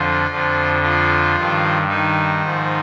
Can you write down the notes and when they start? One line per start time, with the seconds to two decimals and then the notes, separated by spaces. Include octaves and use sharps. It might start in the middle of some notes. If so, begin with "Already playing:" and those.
Already playing: F2 D3 F3 F4
0.29 F2 D3 F3
0.82 F3 F4
1.36 G2 D#3
1.88 D#3 D#4
2.41 G#2 F3